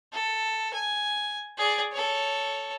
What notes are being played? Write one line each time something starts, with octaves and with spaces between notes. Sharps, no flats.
A4
G#5
G#4 D5
A4 C#5